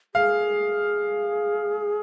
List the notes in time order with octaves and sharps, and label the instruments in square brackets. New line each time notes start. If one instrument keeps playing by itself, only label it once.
[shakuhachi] G#4 [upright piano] F5